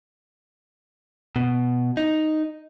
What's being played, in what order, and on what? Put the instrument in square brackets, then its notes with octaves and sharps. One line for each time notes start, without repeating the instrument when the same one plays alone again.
[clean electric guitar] B2
D#4